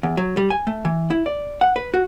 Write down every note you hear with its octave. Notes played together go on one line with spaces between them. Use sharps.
E2
F#3
G3
G#5
A3
E3
E4
D5
F#5
B4
F#4